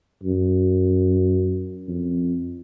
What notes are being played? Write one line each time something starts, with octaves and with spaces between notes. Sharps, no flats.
F#2
F2